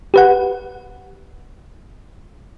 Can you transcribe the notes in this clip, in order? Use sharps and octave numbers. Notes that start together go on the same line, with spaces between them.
G4 B4 F#5